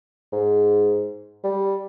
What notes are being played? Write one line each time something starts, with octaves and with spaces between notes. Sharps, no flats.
G#2
G3